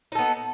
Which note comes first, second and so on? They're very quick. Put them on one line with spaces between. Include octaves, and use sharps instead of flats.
D#4 A4 B3